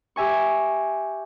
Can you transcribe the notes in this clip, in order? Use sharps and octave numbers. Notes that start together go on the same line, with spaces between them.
G4 E5 G#5 C#6